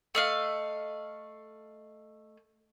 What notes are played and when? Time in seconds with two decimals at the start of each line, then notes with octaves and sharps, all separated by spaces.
0.15 A3 D#5 F5